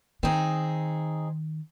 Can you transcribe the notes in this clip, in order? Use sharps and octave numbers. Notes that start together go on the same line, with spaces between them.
D#3 C4 D#4 G#4